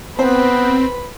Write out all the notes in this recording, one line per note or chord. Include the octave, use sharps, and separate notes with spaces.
B3 C4 B4 C5 B5